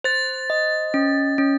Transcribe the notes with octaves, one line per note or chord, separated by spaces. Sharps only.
C5 A6
D#5
C#4
C#4